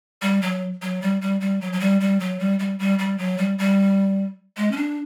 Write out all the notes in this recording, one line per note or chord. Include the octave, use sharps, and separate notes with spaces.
G3
F#3
F#3
G3
G3
G3
F#3
F#3
G3
G3
F#3
G3
G3
G3
G3
F#3
G3
G3
G#3
C#4
D4